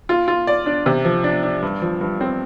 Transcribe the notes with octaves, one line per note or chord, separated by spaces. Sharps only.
F4
F4
D5
D4
C3
F3
D4
D4
G2
F3
G2
C4